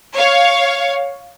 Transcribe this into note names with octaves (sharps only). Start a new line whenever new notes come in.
C#5 F5